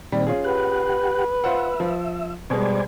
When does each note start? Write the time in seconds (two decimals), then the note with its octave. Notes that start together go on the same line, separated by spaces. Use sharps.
0.12 A#2 D#3 G3 C4
0.27 C#4 F4 G#4
0.44 G4 B4 F#5
1.44 F4 C5 E5 F#5
1.80 F3
2.50 B2 G3 G#3 C5 D5 G#5